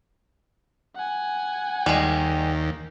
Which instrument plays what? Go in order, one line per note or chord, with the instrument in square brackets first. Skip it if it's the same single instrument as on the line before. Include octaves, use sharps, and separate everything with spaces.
[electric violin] F#5 G#5
[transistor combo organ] D#2 [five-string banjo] G3 G#3